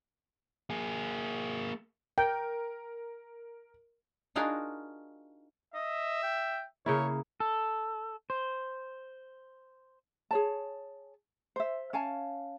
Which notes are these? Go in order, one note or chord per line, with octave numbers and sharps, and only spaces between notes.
A#3 G#4
A#4 G5
D4 D#4 F4 F#4 G#4 A#4
D#5 E5
G5
C#3 A#3 E4 C#5
A4
C5
G#4 C#5 A5
C5 E5
C#4 F5 G#5 A5